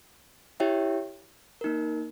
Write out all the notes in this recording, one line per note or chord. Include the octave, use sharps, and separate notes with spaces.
E4 G4 C#5 E5 G5
A#3 D#4 A#4